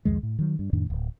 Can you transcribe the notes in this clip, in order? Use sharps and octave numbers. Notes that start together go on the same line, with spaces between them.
C2 F2 D#3 G#3
A2
D#3 F#3
G2
F2 A2 D#3 D4
D1